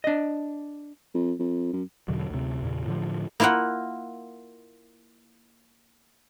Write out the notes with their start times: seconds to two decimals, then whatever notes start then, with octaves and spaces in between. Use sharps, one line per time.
0.04 D4 D#5
1.14 F2
1.39 F2
1.73 F#2
2.08 E2 B2 D3 F#3
2.30 D2 C3
2.62 E2 A#2 C#3
2.86 A2 D3 F3
3.40 A#3 E4 F4 F5 F#5